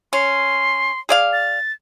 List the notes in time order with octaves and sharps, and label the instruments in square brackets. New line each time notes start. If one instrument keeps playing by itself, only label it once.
[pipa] C#4 [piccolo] C6
[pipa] G#4 D5 F5
[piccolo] A6